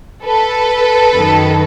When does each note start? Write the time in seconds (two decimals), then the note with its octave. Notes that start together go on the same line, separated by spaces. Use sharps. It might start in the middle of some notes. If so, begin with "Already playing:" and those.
0.23 A4 B4
1.13 F#2 D#3